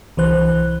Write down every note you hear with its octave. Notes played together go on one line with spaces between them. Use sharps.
C2 E3 C5 F#6